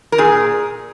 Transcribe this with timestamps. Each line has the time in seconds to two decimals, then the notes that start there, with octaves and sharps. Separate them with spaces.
0.12 A#4
0.18 A#2 G#4